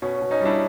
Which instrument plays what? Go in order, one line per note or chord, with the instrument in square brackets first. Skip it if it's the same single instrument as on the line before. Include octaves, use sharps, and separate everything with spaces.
[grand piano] B2 C#4
C#4
B2
C#4 D#4
G3 D4 E4